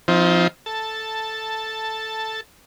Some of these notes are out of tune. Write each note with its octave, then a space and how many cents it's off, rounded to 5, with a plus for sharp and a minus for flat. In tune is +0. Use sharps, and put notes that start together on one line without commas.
F3 +0 C4 +0 D#4 +40
A4 +0 A5 +5